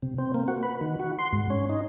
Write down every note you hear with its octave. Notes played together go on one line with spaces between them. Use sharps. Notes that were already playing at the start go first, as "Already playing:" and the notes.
C3
C4
A#3
F#4
B4
D#3
F#4
C6
G#2
C#4
D#4